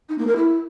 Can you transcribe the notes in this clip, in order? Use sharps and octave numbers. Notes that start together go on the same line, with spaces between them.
D#4
A#3
A#4
E4